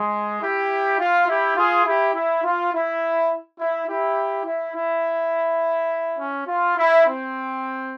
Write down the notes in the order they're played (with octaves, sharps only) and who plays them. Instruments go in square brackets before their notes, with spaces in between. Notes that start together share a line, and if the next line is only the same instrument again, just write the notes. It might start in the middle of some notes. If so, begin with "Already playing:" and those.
Already playing: [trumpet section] G#3
E4 G4
F4
E4 G4
F4 G#4
E4 G4
E4
F4
E4
E4
E4 G4
E4
E4
C#4
F4
E4
C4